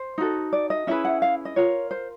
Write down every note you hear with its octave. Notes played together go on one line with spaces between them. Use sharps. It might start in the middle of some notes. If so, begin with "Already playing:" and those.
Already playing: C5
D#4 F#4 A4
D5
D#5
C#4 E4 G#4 B4 E5
F#5
F5
D#5
F4 A#4 C#5
C5